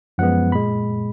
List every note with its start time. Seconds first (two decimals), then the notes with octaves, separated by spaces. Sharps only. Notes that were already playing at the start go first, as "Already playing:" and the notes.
0.18 F#2 F3 G#3 B3 F#5
0.52 A#2 G#3 B5